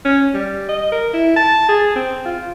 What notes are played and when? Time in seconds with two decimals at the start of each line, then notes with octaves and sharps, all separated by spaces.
0.05 C#4
0.34 G3
0.69 D#5
0.92 A#4
1.13 E4
1.36 A5
1.69 G#4
1.96 C4
2.25 F4